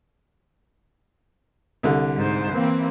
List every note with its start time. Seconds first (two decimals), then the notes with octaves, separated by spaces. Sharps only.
1.83 C2 D3
2.16 G#2 C5
2.53 E3 A#3 C4